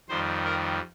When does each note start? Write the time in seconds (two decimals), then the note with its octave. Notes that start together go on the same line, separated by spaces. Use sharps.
0.09 F2 D#3 G3 C5
0.44 A#4